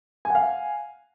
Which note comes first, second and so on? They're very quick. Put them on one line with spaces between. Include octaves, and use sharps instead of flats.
G#5 F#5 F5